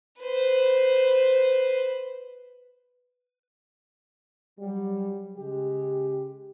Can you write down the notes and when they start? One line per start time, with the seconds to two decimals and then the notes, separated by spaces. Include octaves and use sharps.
0.22 B4 C5
4.59 F#3 G3
5.38 C#3 G#3 G4